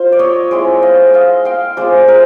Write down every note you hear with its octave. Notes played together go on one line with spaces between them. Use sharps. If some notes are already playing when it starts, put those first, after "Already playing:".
Already playing: F4 C5
D5
C#5 D#5
G#3 C4 E4 C5 D5
D#5 F5
D#5 F5
F5 G5
G#3 C4 F4 C5 D5
G#4 A#4